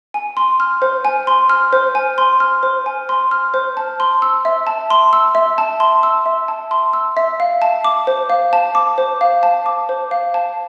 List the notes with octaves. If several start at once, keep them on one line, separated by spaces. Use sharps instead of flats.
G#5
C6
F6
C5
G#5
C6
F6
C5
G#5
C6
F6
C5
G#5
C6
F6
C5
A5
C6
E6
E5
A5
C6
E6
E5
A5
C6
E6
E5
A5
C6
E6
E5
F5
A5
D6
C5
F5
A5
D6
C5
F5
A5
D6
C5
F5
A5